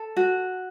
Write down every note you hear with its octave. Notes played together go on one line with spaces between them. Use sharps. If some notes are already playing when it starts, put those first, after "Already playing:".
Already playing: A4
F#4